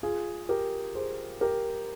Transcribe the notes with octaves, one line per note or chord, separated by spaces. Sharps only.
F4 G#4
G4 A#4
G#4 C5
G4 A#4